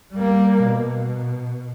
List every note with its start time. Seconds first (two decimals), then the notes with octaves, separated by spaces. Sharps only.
0.13 G3 A#3
0.64 B2